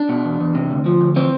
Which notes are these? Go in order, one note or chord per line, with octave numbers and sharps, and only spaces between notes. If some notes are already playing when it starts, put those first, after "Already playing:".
Already playing: D4
B2
E2
E2
C3
D2
F3
D2
E3 C4